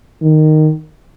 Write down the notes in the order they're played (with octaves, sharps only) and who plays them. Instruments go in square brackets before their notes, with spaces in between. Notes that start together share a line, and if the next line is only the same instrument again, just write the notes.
[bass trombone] D#3